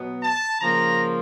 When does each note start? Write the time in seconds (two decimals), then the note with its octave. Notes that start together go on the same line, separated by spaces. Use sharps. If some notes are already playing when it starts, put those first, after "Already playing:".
Already playing: B2 F#3 B3
0.23 A5
0.61 C#3 F3 A#3 A#5